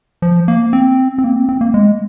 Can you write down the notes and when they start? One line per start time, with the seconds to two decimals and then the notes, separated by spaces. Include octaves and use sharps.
0.22 F3
0.48 A#3
0.73 C4
1.18 C4
1.24 A#3
1.36 C4
1.49 C4
1.61 A#3
1.74 G#3